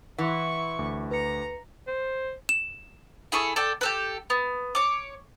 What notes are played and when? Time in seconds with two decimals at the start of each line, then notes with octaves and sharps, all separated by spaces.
0.18 E3 E4 F#5 C6 C#6
0.79 D2 D6
1.11 B4 A#5 C#7
1.87 C5
2.49 E7
3.32 E4 G#4 A4 C#6
3.56 A4 D5 G5
3.81 G4 A4 B4
4.30 B3
4.75 C#5 D6